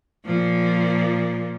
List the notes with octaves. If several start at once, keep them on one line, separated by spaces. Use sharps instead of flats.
A#2 F3